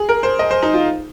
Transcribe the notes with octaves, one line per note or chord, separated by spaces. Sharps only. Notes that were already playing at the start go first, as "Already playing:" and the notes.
Already playing: G#4
A#4
C5
D#5
C5
D#4
F4